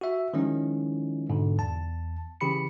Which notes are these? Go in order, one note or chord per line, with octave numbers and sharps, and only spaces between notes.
F#4 E5
D#3 F3 G#3 C#4 E4
G#2 B2 D3
E2 A5
C#3 E3 G4 B5 C#7